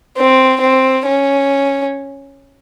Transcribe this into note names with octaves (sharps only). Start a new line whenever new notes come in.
C4
C4
C#4